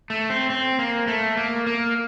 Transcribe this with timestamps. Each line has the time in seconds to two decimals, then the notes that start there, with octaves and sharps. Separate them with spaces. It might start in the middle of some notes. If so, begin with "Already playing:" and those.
0.10 A3
0.30 C4
0.50 C4
0.79 A#3
1.07 A3
1.37 A#3
1.67 A#3